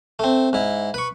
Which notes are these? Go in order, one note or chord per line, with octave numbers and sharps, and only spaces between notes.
A3 C4
G#2 E4
B4 C#6